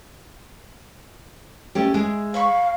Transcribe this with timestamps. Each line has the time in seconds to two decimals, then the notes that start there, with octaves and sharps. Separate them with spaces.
1.75 A3 C#4 G4 D5
1.94 G#3 E4 G#4
2.34 C#5 F5 B5 C#6